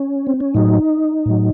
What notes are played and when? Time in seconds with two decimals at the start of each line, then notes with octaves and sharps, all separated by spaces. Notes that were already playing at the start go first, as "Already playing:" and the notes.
Already playing: C#4
0.27 C4
0.40 C#4
0.54 A2 F#3 D#4
1.26 A2 F#3